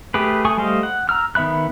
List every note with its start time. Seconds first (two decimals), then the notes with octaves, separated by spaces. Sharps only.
0.14 A3 G4 G#4 B4
0.45 A3 G#4 G#5 C#6 D#6
0.57 G3 A3 C5 D#5 F5
0.83 F#5
1.09 A#5 E6 F6
1.35 D#3 B3 E5 B5 F#6